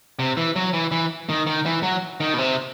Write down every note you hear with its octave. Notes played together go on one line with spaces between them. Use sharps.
C3
E3
F#3
E3
E3
D#3
D#3
E3
F#3
D#3
B2
C3